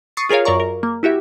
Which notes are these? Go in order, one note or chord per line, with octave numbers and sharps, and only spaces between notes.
C#6 D#6 A6 C7 C#7
F4 G#4 A#4 C#5 F5
F#2 A#4 D5 A#5 C#6
A#4
A#3
E4 F#4 G4 E5